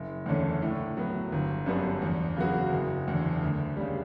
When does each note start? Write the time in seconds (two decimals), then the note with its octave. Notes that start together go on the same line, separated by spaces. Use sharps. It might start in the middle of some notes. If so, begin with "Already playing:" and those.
Already playing: F#1
0.26 E2 D3 A3 C#4
0.62 A2
0.97 F#3 B3
1.32 G1
1.66 F#2 D3 G3 B3
2.02 E2
2.36 C#3 F#3 B3 F#4
2.72 F#1
3.08 E2 D3
3.43 D2
3.77 C#3 G3